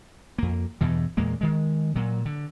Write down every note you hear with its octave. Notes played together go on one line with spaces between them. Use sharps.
F2 A#3
E2 G2 B2 E3
E2 A#2 G#3 A#3
D#3 G#3
A#2 F#3
D3